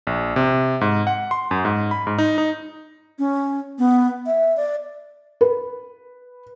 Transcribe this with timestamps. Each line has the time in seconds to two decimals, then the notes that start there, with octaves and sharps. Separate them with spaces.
0.07 A#1
0.36 C3
0.81 G#2
1.07 F#5
1.31 C6
1.51 F#2
1.65 G#2
1.91 B5
2.07 G#2
2.18 D#4
2.38 D#4
3.19 C#4
3.78 B3
4.26 E5
4.57 D5
5.41 B4